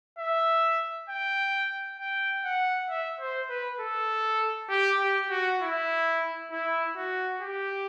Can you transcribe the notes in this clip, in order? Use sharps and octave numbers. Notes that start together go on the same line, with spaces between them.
E5
G5
G5
F#5
E5
C5
B4
A4
G4
G4
F#4
E4
E4
F#4
G4